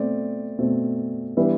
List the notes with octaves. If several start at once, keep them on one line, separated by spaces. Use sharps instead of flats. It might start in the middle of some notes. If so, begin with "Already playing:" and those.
Already playing: B2 A3 C4 D5
B2 A3 C4
E3 G3 B3 D4 E5